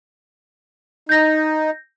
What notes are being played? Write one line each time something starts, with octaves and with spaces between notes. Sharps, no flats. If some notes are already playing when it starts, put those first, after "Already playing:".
D#4 G6 A#6